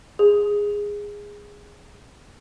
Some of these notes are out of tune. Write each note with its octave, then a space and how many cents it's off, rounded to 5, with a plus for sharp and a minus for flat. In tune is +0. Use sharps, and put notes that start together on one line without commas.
G#4 -15